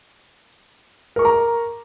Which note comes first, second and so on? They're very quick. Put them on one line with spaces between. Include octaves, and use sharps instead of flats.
A#4 C#6 D6 A#5